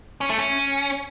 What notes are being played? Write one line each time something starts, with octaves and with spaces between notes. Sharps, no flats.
C#4
A3
C#4